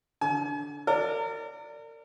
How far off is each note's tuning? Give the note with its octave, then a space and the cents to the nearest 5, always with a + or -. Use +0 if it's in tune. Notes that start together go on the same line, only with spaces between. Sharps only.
D3 -15 G#5 +40
A#4 -35 D5 +0